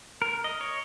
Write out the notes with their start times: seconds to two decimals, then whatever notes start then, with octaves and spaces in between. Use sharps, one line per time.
0.22 A#4
0.44 D#5
0.61 C#5